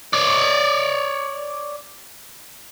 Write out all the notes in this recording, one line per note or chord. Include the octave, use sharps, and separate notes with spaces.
C#5 D5